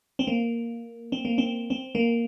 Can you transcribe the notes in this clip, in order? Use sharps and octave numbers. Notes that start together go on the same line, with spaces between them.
C4
A#3
C4
A#3
C4
C4
A#3